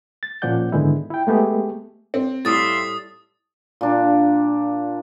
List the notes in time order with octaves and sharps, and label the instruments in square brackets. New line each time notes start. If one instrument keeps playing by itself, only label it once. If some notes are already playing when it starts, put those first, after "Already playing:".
[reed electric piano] A6
A#2 F3 C#4 D5 F#5 G6
G#2 D3 D#3 G#3 B3 E4
E4 G5
G#3 A3 B3 G4 G#4
[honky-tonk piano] C4
[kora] A2 G3 A3 [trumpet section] E5 F5 C6 [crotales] D#6 A6
[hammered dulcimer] A#2 D4